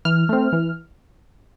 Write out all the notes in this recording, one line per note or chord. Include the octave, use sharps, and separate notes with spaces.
E3 F6
A3 C4
E3